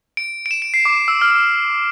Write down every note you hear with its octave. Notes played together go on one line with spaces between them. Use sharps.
D7
D7
E7
D7
C7
D6
E6
F6
E6